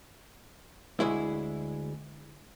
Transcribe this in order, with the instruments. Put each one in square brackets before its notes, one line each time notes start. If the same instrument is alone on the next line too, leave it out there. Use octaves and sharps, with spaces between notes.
[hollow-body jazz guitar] D2 G#3 E4